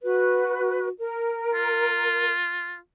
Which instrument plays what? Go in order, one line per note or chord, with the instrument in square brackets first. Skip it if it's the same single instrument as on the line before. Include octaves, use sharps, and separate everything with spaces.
[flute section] F#4 B4
A#4
[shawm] F4